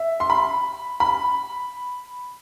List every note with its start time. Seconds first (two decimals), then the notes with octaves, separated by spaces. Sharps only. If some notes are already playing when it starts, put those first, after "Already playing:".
Already playing: E5
0.20 C6
0.30 B5
1.00 B5